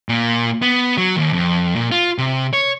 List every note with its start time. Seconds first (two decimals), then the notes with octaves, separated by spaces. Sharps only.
0.09 A#2
0.62 B3
0.98 F#3
1.17 D#2
1.33 F2
1.76 A#2
1.92 F4
2.18 C3
2.53 C#5